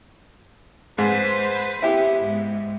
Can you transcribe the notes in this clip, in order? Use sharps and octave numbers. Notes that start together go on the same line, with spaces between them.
G#2 B4 C5
B3 E4 G4
G#2